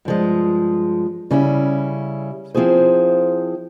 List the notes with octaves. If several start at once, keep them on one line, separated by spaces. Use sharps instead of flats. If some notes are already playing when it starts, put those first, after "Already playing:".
G2 F3 G#3
C#3 G3 C#4 E4
F3 C4 E4 G#4 C5